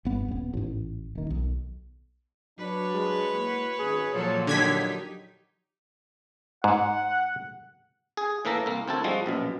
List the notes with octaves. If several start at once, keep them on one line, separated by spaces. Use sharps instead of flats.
G1 B3
D#1 B3
A1 G#2
D#1 D#3
B1
F#3 D4 B4 C#5
G#3
A#3 E4 F#4
G#1 F#2 G#4
A#2 F3 F#3 A4 C#5
D3 F#3 D#4 G4 G#6 B6
G#2 F#5
G#4
A2 E3 A#3 A4 A#5
C2 A#3
D2 C4 E4 F#4 A4 A5
F3 G3 G#3 F#4
A#1 F#2 B2